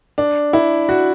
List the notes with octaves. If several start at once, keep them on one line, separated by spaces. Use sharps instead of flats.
D4
E4
F#4